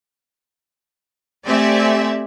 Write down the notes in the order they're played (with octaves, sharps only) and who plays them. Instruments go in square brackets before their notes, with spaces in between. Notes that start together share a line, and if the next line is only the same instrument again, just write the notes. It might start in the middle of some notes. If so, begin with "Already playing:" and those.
[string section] A3 C4 G4 D5 E5 G#5